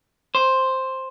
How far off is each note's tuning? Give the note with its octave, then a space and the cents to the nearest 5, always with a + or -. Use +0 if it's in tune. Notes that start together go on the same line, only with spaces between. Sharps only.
C5 +5